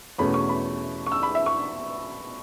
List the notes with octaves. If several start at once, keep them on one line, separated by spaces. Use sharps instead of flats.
E2 B2 A3 C#4 B5
C#6
B5
C#6
E6
B5
E5
C#6